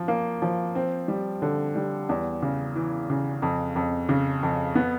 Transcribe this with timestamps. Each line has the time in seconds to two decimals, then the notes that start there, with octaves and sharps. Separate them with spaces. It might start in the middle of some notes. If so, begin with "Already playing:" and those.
Already playing: F3
0.08 A#3
0.42 F3
0.75 C4
1.08 G3
1.42 D3
1.75 G3
2.09 E2
2.42 C#3
2.75 E3
3.10 C#3
3.42 F2
3.76 F2
4.09 C#3
4.43 F2
4.75 B3